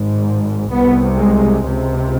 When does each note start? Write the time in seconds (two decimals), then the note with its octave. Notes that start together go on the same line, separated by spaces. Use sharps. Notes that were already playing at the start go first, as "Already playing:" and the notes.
Already playing: G#1 G#2
0.72 C2 C3 B3
1.19 G#3
1.66 C#2 C3